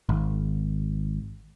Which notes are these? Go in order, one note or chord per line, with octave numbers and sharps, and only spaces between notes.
G#1